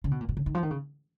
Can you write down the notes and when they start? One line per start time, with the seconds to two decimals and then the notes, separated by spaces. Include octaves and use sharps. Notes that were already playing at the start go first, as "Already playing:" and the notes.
0.04 C#3
0.11 B2
0.21 A#2
0.29 B2
0.37 C#3
0.46 D#3
0.55 F3
0.63 D#3
0.71 C#3